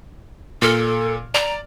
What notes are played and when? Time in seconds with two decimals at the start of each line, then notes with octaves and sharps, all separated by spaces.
0.62 A#2 A4 F6
1.34 D5 A#5